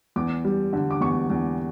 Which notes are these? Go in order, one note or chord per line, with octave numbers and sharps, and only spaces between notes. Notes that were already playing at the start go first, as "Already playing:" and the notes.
E2 D6
G3
D3
D6
E2 C#6
E2